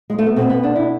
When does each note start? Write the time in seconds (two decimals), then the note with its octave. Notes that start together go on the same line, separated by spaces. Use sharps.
0.10 G#3
0.19 A3
0.27 B3
0.36 B2 C4
0.50 B3
0.63 D4
0.76 E4